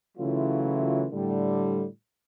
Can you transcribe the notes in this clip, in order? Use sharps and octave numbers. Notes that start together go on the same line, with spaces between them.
C#3 E3 F#3 A3 E4 F4
A2 D3 G3